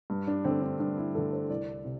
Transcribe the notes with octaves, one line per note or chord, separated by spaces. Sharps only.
G2
D4
D3 A3 C4
D4
G2 D4
E4
D3 A3 A4
C5
C2 D5
C3